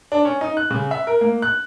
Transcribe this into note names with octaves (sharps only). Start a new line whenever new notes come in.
D4
C#4
D#4
F#6
C#3
E5
A#4
A#3
F#6